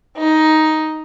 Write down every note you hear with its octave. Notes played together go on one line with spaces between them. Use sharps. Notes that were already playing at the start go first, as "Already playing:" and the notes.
D#4